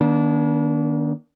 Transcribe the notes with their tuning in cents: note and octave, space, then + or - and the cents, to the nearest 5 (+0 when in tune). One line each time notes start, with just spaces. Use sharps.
D#3 -5 A#3 +45 D4 -30